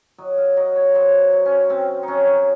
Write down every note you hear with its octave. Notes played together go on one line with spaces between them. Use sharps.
F#3 D#5
F5
F#3 D#5
C#5
F#3 C5
F#3
C#4
C3 C4
D#4
F#3 C#4